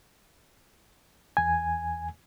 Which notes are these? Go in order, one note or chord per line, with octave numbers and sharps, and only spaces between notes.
E2 G#5